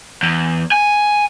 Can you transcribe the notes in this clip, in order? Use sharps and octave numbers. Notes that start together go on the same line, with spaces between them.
E2
G#5